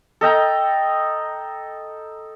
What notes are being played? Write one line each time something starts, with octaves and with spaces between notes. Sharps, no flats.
A4 D#5 G5 A#5